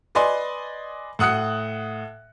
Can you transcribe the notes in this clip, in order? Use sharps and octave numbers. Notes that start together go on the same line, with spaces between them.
B4 D5 D#5 G#5 C6
A2 F#5 D#6 F#6 C#7